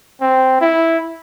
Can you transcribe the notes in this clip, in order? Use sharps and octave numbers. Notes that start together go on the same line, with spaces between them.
C4
E4